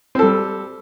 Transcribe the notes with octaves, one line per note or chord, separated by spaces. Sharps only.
G3 C4 A4